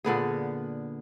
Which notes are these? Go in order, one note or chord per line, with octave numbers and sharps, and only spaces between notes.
A#2 D3 B3 G#4